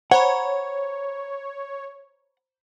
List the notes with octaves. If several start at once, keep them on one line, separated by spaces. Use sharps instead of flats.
C5 C#5 F#5 A#5 B5